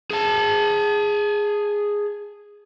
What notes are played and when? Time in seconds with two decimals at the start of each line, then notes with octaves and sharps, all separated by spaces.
0.11 G#4 A5